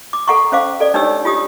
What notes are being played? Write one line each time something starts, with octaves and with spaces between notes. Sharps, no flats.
D6
A4 F#5 A#5 C#6
C#4 C5 F5 D6
A4 D5
D4 D#4 G4 C#5 E6
F4 G4 D#6